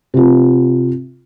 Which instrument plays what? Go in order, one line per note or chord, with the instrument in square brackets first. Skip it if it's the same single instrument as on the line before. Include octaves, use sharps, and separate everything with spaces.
[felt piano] C3 F4